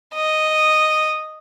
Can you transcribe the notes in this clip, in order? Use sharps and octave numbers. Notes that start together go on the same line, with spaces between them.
D#5